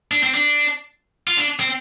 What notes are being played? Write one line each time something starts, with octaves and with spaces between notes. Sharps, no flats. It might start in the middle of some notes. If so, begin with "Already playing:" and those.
D4
C4
D4
F4
D4
C4